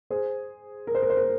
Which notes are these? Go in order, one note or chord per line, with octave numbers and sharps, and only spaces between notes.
G#4 C5
A#4
C5
A#4
C5
A#4